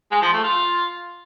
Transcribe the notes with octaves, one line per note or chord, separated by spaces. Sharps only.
G#3
F3
A3
F4